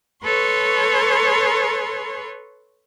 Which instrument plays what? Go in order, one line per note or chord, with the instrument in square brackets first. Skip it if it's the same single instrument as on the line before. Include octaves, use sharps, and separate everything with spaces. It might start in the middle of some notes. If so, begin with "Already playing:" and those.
[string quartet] A4 B4 C#5 C6 C#6